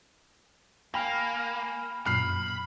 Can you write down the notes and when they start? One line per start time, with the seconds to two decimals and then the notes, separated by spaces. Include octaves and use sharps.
0.94 A#3 G5 G#5 B5 F6
2.06 F#2 A#2 B5 F6 C7